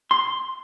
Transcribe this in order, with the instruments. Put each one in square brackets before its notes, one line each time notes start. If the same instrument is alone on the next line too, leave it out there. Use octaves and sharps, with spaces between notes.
[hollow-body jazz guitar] C6